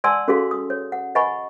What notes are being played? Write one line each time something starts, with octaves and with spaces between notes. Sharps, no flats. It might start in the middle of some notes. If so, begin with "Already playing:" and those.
D5 F#5 G#5 A5 C6 E6
C#4 F#4 G#4 A4 F5 C6
D#6
C#5
F#5
D#5 F#5 G#5 B5 C#6